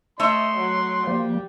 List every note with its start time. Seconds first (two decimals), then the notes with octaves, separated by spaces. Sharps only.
0.20 A3 C#5 D#5 E5 C6
0.58 F#3
1.07 F3 G3 A#3